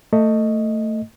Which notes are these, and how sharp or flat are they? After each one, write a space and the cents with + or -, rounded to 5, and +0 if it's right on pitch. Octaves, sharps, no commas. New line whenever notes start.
A3 +20 D#5 +0